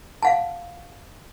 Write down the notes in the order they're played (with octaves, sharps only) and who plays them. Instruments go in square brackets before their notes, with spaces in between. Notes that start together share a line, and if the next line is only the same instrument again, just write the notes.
[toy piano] F5 F#5 A5